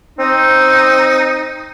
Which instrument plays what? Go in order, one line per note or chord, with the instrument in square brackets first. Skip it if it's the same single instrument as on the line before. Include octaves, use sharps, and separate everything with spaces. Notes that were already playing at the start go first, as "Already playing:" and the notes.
[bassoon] C4 [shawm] D#4